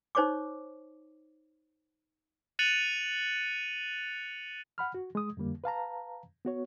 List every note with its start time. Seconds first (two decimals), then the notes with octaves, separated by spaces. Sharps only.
0.15 D#4 C5 C#5 C#6 D6
2.59 F#6 A6 C#7 D#7 F7 F#7
4.78 F#5 B5 F6
4.94 F#4
5.15 G#3 D#6
5.37 F2 D3 G3 A#3
5.64 B4 F5 A5 A#5
6.45 B3 F#4 C#5